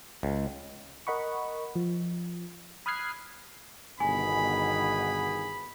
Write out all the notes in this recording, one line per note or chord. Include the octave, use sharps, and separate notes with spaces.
C#2
A#4 D#5 F#5 B5 C#6
F3
B5 D#6 F6 F#6 G#6 C7
G1 B2 D#3 B3 G#4 G#5 B5